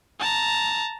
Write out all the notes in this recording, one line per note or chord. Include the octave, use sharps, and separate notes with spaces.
A5 A#5